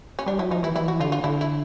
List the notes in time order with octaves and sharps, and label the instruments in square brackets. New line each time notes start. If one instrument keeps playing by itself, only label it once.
[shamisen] C#4
[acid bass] G3 [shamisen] D4
[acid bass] F#3 [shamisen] E4
[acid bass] F3 [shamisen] D#4
[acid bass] E3 [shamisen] E4
[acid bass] E3 [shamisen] E4
[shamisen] F#4
[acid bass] D3 [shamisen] F4
[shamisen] F4
[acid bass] D3 [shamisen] E4
[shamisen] E4